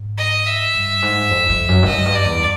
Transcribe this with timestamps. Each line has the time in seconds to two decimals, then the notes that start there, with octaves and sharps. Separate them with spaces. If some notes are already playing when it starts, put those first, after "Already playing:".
Already playing: G#2
0.18 D#5
0.46 E5
0.74 G2
1.02 G#2
1.31 F2
1.49 F2
1.68 F#2
1.82 G2
1.87 F#2 D#5
2.05 G2
2.15 D5
2.24 E2